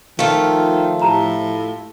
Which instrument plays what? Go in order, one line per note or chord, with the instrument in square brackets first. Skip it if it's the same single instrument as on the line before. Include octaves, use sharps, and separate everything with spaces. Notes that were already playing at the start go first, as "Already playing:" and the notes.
[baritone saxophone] D#3 [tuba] F3 [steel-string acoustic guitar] A3 F4 [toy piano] F5
[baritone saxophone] A2 [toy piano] G4 A5 A#5